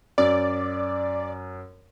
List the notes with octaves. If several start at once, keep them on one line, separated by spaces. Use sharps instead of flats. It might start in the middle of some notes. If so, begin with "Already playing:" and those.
F#2 D5